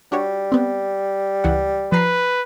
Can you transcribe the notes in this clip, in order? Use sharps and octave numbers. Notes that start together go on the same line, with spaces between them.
G3 D4 F#4 C#5
B3 C4
C#2 E3 F#5
F3 B4 A#5 C7